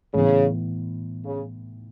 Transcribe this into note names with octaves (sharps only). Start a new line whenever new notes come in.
A2 C#3 E3 B3
C#3